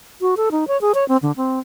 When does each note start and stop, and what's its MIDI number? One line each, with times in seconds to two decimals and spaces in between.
0.21 0.35 66
0.37 0.49 69
0.51 0.68 63
0.68 0.80 73
0.81 0.92 68
0.95 1.07 73
1.08 1.17 60
1.23 1.32 50
1.37 1.59 60